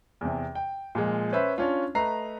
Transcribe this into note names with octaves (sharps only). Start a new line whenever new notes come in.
E2 C3
G5
A#2 F3 G#3
C#4 B4 C5 E5
C#4 D4 F4
A3 B4 D#5 A#5 C7